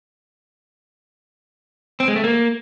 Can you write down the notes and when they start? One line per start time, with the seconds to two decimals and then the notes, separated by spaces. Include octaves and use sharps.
2.00 C4
2.08 G#3
2.16 A3
2.24 A#3